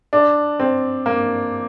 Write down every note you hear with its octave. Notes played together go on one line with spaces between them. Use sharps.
D4
C4
A#3